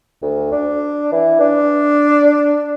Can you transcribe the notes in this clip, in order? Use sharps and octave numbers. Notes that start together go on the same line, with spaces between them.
D2
D4
E3
D4